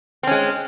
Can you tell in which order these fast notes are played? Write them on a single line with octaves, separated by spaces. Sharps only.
C4 C#4 G#3